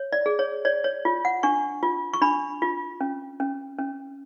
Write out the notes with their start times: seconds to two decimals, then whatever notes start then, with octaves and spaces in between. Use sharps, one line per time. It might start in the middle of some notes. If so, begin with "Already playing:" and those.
Already playing: C#5
0.12 D5
0.26 G#4
0.39 C#5
0.65 C#5 D5
0.84 C#5
1.05 F4
1.25 F#5
1.43 D4 C#6
1.83 F4
2.14 C#6
2.22 D4 B5
2.62 F4
3.01 C#4
3.40 C#4
3.79 C#4